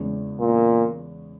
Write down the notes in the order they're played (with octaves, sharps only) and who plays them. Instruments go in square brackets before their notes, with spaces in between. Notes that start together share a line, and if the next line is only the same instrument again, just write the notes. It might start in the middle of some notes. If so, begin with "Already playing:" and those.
Already playing: [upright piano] E2 C#3 G#3
[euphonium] A#2